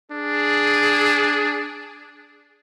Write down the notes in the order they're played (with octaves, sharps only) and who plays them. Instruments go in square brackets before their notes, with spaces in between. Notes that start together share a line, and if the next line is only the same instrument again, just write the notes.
[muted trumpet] D4 [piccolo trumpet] G#4